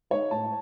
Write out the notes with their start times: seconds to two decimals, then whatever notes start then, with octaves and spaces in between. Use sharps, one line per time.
0.10 G#3 D#4 C#5
0.31 A2 A5